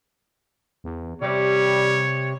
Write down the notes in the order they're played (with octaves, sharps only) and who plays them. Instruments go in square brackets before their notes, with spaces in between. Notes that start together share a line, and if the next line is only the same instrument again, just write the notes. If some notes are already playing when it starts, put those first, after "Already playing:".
[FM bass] E2
[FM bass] C3 [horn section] G3 [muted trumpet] C#5